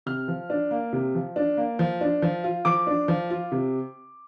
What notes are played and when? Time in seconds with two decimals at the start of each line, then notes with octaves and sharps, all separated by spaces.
0.06 C3 F6
0.28 F3
0.50 D4
0.71 A#3
0.93 C3
1.15 F3
1.36 D4
1.57 A#3
1.79 F3
2.01 D4
2.22 F3
2.44 F4
2.65 F3 D6
2.87 D4
3.08 F3
3.30 F4
3.52 C3